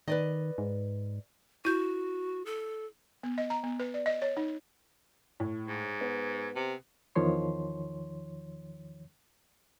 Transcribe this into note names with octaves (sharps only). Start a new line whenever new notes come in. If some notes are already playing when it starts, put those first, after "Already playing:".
D#3 B4 D5 D#5
G#2
E4 F#4 G6
A4
B3
D#5
A#5
B3
B4
D5
D#5
C#5
D#4
A2
G#2
B3
C3
E2 D#3 F3 C#5 C6